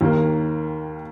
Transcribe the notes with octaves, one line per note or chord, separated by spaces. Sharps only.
D#2 D#3 A#3